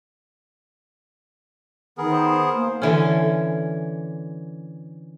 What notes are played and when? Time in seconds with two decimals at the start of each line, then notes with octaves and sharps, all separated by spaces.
1.98 D#3 B3 G#4 A#4
2.11 C5
2.56 A#3
2.82 D3 E3 C#4